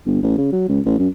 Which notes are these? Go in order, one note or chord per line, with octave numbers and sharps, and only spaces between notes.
G1
A1
C#3
F#3
C#2
A1
F#2